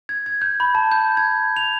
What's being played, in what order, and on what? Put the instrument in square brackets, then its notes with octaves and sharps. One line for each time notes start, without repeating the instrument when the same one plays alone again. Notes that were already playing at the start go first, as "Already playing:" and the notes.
[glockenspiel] G#6
G#6
G6
B5
A5
G6
G#6
F7